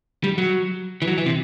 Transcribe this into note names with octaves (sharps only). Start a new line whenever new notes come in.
G3
F#3
E3
F#3
E3
C3